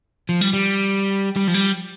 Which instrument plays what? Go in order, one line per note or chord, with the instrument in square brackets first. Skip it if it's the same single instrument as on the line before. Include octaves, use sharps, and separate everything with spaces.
[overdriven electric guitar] F3
G3
G3
G3
F3
G3